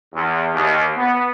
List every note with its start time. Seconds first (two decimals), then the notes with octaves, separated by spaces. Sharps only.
0.14 E2
0.53 D#2
0.96 B3